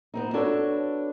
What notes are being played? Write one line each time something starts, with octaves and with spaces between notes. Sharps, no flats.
B3 C4 D#4
D4 F#4 A4 B4 C#5